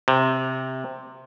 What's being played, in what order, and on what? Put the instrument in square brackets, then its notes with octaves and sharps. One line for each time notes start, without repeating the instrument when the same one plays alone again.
[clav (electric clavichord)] C3